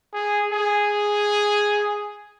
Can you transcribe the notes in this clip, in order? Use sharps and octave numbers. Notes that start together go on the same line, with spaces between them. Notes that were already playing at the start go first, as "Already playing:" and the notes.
G#4
G#4